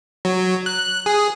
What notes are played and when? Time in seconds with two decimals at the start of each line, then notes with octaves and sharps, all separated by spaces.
0.25 F#3
0.66 F#6
1.06 G#4